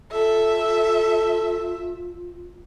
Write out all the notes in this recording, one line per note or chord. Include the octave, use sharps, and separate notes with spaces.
F4 A4 E5